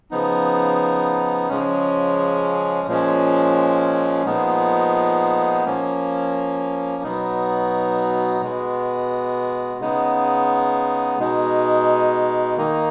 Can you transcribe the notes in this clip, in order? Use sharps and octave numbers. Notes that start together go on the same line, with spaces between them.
C#3 F3 B3 D#4
C#3 F3 G#3 C#4
A#2 F3 G#3 C#4
A#2 F3 G#3 B3 D#4
F3 A#3 C#4
B2 F#3 B3 D#4
B2 G#3 B3
C#3 G#3 B3 D#4
B2 G#3 D#4
D#3 A#3 D#4